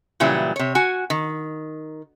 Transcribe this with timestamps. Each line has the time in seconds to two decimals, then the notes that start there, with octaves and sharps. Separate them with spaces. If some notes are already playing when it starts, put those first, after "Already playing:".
0.20 A#2 C#3 E3 F#3 G3 E4
0.56 C3 C#5
0.75 F#4 G#5
1.10 D#3